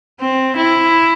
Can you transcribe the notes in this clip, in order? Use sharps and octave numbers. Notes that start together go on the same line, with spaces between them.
C4
E4